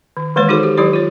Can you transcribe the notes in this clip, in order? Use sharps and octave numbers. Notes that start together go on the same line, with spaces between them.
D#3
D#3 E3 G#3 A#3 B4 C#5
D#4 F#4 G#4 A4 C5
G4
D#3 F#3 E4 G4 C#5
F4 C#5